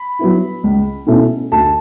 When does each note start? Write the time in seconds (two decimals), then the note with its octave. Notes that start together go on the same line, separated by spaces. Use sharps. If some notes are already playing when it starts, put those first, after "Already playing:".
Already playing: B5
0.19 F#3 B3 E4
0.64 C#2
1.07 B2 A3 C#4 E4
1.52 D2 A5